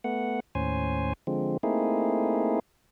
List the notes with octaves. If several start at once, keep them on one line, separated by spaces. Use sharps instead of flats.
A3 B3 F#5
D#2 A2 C#4 C5 G#5
D3 F3 G#3 C4
A3 A#3 C4 D#4 E4 G#4